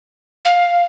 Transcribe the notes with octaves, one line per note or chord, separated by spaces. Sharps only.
F5